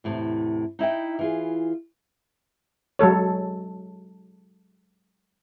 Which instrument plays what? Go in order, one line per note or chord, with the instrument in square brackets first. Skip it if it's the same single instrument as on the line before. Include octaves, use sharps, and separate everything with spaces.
[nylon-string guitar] E2 A2 C3
D#4 E4 D#5 G5
E3 F4 G#4
[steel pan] F#3 G#3 A4 C#5